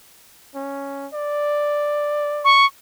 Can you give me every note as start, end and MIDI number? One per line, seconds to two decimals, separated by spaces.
0.55 1.07 61
1.13 2.63 74
2.45 2.66 85